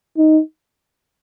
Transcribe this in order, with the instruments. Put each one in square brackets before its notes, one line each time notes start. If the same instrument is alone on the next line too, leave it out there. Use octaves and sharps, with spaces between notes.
[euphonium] D#4